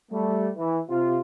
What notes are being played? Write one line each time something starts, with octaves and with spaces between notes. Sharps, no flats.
G3 A3
E3
C3 F4